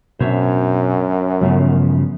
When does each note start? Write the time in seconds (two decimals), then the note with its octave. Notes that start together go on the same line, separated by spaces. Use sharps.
0.20 F#2 B2 C4 D4 C5 C#5 E5
1.41 G2 C#3 F3 F#3 A3 B3